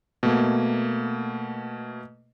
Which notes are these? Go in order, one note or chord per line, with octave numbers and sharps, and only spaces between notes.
B2 A3 A#3